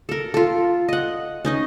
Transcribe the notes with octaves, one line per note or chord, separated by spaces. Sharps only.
A4 A#4
F4 A4
D#5 F#5
C#4 D#4 D#5